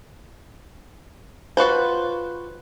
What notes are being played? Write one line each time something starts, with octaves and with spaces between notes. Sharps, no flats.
F4 F#4 B4 C5